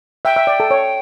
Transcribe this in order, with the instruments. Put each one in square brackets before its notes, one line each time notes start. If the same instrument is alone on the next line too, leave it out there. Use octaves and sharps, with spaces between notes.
[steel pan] E5 [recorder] G5
[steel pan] E5
D5
A4
C#5